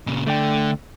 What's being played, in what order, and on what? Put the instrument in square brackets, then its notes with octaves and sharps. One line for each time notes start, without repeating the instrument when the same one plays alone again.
[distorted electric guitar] A#2 C#3
[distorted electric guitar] D3 [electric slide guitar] A3 D5 G5